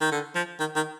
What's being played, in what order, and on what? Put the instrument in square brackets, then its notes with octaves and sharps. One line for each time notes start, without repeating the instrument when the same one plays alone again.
[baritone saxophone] D#3
D3
F3
D#3
D#3